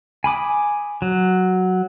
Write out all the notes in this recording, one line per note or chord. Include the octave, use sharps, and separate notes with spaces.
G#5 B5 D6 D#6
F#3